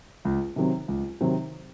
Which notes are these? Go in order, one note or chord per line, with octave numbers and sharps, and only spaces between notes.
C#2
C3 D#3 F#3 C4
C#2
C3 D#3 F#3 C4